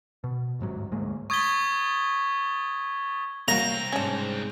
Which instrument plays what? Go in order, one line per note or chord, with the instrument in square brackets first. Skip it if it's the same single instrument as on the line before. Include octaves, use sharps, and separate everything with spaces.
[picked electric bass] B2
D1 G1 G#2 F#3
D2 G#2 G#3 A#3
[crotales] C#6 D#6 G#6 A6 B6 G7
[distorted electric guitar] C2 C4 [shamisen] A#3 F#4 [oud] C#4 [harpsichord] A#5
[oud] G#2 C#3 [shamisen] C#4 D4